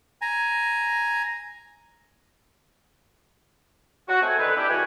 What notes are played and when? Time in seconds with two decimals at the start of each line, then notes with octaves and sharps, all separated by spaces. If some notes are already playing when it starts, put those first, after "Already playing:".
0.22 G#5 A#5
4.08 F#4
4.21 A3 C4 G#5
4.38 D3 D#3 B3 C4 B4
4.56 D4 E4 G4
4.68 C#2 E3 G3 F#4 G5 G#5